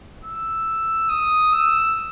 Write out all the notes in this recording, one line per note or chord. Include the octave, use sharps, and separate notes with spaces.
E6
D#6
E6